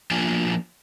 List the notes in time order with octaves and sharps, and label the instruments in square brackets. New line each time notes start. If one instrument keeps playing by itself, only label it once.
[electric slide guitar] F3 A#3 D4 F4 G#5